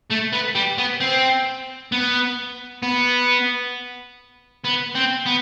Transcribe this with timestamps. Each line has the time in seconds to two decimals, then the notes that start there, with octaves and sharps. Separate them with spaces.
0.10 A3
0.32 B3
0.55 G3
0.78 B3
1.00 C4
1.92 B3
2.83 B3
4.65 B3
4.95 C4
5.26 B3